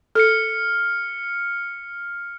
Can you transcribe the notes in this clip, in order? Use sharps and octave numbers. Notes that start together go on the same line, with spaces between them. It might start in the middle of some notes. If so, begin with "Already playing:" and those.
A4 F6 C#7